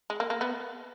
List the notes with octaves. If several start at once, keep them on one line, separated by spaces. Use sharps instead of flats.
G#3
A#3
A#3
B3